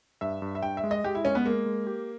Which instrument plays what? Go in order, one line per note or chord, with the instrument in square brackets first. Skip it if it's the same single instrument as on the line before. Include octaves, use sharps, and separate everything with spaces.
[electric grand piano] G2 [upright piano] E5
[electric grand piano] G2
[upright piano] E5
[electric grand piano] G2 [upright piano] G5
[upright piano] E5
[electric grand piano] G#3
[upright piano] D#5
[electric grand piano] G#3 [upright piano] G4
[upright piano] E4
[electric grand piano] G#3 [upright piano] C#4
[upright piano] B3
[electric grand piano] G#3 [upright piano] A#3
[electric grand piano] G#3
G4